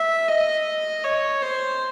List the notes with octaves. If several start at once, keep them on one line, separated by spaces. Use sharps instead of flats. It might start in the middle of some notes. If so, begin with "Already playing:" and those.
Already playing: E5
D#5
C#5
C5